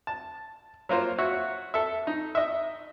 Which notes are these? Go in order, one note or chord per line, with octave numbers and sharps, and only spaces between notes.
A5
F#3 A#3 F4 C5
F#4 C#5 E5
A4 E5
D#4
D#5 E5